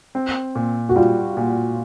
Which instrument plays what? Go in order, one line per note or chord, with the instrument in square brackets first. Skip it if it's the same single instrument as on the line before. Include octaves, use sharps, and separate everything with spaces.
[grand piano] C4
A#2
[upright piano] F#4
[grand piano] G3 [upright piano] F4
[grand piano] A#2